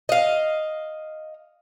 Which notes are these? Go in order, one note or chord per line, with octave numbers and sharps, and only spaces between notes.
D#5 F5